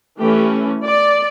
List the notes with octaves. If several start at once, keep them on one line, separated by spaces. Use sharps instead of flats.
E3 A3 C#4 G4
D5